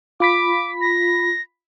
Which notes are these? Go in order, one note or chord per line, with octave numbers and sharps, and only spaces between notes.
F4 B5 D6 B6
A#6